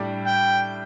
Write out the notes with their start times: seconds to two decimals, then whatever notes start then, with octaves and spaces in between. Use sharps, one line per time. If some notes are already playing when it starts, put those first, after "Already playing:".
Already playing: A2 G3 D4 G4
0.27 G5